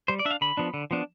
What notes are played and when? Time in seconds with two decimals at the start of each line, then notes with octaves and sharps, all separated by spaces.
0.08 G3 C5
0.19 D5
0.25 D4 E5
0.31 F5
0.41 D3 B5
0.57 F3 B3 D4
0.74 D3
0.91 F3 B3 D4